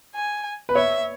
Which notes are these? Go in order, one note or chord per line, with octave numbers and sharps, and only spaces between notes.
G#5
B4
C#5 E5